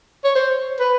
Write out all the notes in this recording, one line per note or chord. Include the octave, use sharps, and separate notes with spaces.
C#5
C5
B4